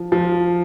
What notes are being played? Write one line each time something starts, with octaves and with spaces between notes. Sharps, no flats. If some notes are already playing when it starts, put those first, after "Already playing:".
Already playing: F3
F3